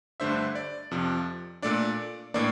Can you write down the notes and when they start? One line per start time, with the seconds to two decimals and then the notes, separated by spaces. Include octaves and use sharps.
0.20 G2 D3 A3 D4 C5 E5
0.55 D5
0.91 F2 C3 F3
1.62 A#2 A3 D4 D5
2.34 A2 E3 A#3 D4 D5